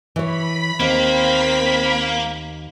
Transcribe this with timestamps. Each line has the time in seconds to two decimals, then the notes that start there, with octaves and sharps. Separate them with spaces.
0.16 E3 C#5 B5 B6
0.80 D#2 A#3 C4